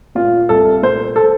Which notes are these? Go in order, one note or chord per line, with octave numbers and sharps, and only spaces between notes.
A#2 F4
C2 A4
A#2 C5
A4